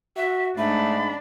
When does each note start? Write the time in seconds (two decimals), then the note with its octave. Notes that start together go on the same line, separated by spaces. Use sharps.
0.17 F#4 E5
0.58 G#2 A3 D4 B5